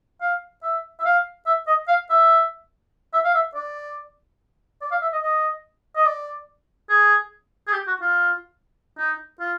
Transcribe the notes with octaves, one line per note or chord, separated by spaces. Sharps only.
F5
E5
E5
F5
E5
D#5
F5
E5
E5
F5
E5
D5
D5
F5
E5
D#5
D#5
D#5
D5
G#4
G#4
G4
F#4
F4
D#4
F4